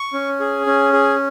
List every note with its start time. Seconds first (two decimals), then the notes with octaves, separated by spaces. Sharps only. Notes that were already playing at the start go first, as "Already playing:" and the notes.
Already playing: C#6
0.13 C#4
0.40 G#4
0.66 C#4
0.93 G#4